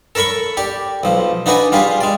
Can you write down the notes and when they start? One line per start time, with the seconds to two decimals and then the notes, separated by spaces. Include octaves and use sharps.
0.15 A4 A#4 C#5 B5 C#6
0.57 G4 D5
1.03 B1 F3
1.46 D4 D#4 F#4 B4 D5 G#5
1.72 G3 F4 G4 G#4
2.01 G#3 D5